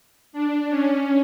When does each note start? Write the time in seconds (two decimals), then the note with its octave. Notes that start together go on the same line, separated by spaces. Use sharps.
0.33 D4
0.70 C#4